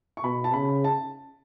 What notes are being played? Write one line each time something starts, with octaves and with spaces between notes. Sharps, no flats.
C#6
B2 B5
A5
C#3 B5
A5